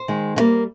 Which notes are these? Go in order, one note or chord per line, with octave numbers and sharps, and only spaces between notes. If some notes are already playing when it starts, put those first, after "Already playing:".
Already playing: C5
D#3 G#3
D3 G3 A#3